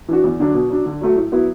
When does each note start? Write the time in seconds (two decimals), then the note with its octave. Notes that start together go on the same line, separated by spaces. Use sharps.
0.08 E3 D4 F#4
0.24 E2
0.40 D3 F#3 D4 F#4
0.54 B2
0.70 F#3 D4
0.86 D3
1.01 F#3 A3 F#4
1.16 A2
1.32 F#3 B3 E4